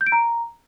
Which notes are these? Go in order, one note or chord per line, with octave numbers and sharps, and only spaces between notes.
G6
D7
A#5